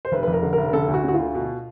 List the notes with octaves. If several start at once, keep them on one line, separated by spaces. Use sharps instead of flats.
C5
F1 B4
F2 B4
A#4
D3
F1 A#4
A#4
D3 A4
D2
F#4
D3 F#4
F4
D2
B2